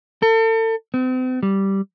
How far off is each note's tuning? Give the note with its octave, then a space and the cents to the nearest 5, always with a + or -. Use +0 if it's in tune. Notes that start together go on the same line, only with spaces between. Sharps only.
A4 +40
C4 -40
G3 -5